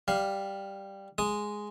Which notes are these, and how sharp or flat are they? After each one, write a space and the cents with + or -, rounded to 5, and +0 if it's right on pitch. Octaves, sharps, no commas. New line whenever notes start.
G3 +0 F5 +0
G#3 +0 D#6 +0